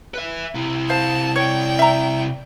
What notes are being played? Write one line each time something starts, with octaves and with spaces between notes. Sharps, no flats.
B4 E5
C3 E4
C5 F5 A5
C#5 D5 G5
E5 A#5